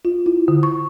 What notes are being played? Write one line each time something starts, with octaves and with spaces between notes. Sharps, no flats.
F4
E4
D3
C#6